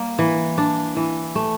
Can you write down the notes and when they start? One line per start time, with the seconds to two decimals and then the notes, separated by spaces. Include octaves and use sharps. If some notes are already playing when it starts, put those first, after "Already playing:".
Already playing: G3 A#3
0.19 E3
0.58 D4
0.96 E3
1.35 A3